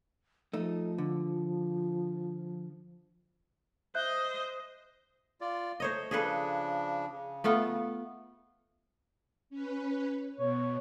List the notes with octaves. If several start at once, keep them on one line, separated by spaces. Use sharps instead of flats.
F3 A3 D#4
D3
C5 D#5 E5 F#6 G6
F4 D5
A3 C5 C#5 D#5
C#3 F3 D4 G#4 A4 B4
C#3
A3 B3 F4
C#4 B4
B2 C#5